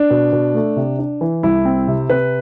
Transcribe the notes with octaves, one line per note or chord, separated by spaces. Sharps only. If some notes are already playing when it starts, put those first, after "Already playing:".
Already playing: D4
B2
B2
A3
C3
D4
E3
C2 E4
C4
C3
C3 B4